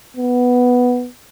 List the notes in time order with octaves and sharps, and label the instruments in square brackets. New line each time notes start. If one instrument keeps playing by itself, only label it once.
[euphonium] B3